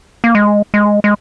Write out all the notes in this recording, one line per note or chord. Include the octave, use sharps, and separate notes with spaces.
A#3
G#3
G#3
G#3